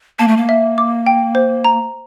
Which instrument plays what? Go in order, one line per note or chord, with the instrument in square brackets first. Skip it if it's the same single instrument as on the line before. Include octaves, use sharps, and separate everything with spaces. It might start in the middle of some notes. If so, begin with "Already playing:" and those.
[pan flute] A#3 [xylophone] A5
[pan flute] A3
A#3
[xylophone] E5
D6
G5
C5
A#5